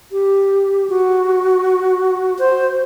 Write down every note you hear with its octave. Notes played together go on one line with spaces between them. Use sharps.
G4
F#4
C5